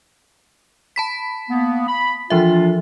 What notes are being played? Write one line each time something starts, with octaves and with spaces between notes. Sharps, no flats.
A5 B5 B6
A#3 B3
B5
E3 F3 D4 F4 E5